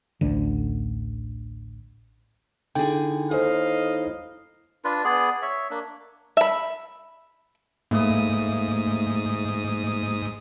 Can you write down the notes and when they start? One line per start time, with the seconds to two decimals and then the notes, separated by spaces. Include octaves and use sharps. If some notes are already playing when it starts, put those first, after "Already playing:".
0.21 A1 D2 D3
2.75 D3 D#4 E4 G#4 G5
3.31 D#2 A4 C5 D#5 F5
4.84 D4 F4 B4
5.05 B3 G#4 D5
5.42 C#5 E5
5.71 A#3 D4
6.37 E5 B5
7.91 G#2 A3 A#3 D#6